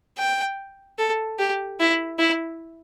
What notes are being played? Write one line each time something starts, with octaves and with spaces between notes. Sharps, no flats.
G5
A4
G4
E4
E4